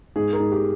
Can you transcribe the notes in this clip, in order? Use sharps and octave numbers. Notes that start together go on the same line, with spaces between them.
G#2 G#4
A#4
G#2
G4